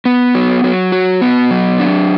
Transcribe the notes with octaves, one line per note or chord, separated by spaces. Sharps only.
B3
F#3
F#3
F#4
B3
F#3
D4